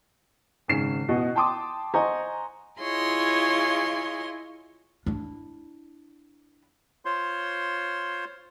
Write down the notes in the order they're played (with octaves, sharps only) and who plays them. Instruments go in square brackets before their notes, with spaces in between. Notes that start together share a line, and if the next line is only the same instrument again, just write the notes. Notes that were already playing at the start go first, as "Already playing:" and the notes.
[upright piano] G#1 G#2 C#3 C7 E7
A1 B2 D#5 F#5
G5 A5 C6 D6 D#6
C5 D#5 F#5 G#5 A#5 C#6
[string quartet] E4 F4 G#4 C#5 D#5 C6
[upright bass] D4 E4
[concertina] F4 C5 C#5 C6